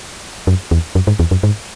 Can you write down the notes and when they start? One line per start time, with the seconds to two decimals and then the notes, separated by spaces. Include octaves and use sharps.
0.47 F#2
0.71 E2
0.95 F#2
1.07 G#2
1.19 E2
1.31 F#2
1.43 G#2